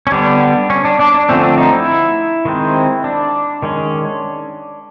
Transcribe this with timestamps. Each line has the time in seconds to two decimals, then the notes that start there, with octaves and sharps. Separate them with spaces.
0.07 C#4
0.12 D3 G3 B3 D4
0.70 C#4
0.85 D4
0.99 D4
1.14 D4
1.29 D3 F3 A3 C4 C#4
1.43 D4
1.58 D#4
1.73 E4
2.45 D#3 G#3 C4
3.04 D4
3.63 D#3 G#3 C#4